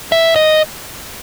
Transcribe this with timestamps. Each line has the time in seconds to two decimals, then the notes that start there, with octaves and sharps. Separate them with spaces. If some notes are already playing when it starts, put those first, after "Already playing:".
0.12 E5
0.36 D#5